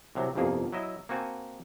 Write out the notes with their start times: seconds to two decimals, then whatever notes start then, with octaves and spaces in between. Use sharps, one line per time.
0.15 C2 C3 F#3
0.35 G1 C2 F2 A#3 G#4
0.73 F#3 E4 D#5 E5
1.09 A#3 C4 F#4 G#5 A5